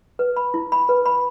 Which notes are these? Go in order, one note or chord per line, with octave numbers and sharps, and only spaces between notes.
B4
B5
E4
B5
B4
B5